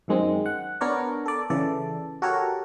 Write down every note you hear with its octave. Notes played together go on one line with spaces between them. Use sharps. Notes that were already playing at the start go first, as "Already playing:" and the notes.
F#2 D#3 G#3 C4
F#5
B3 D4 A#4 C#5 D5
A4 D5
C#3 E3 A4 D5
F#4 G4 A4 A#4 C#5